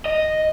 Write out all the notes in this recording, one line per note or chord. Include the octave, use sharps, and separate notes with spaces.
D#5